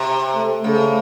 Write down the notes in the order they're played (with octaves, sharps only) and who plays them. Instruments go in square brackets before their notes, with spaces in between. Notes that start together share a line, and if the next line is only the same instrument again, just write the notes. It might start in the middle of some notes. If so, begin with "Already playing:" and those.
Already playing: [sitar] C3
[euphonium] A3
[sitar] C#3 [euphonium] A3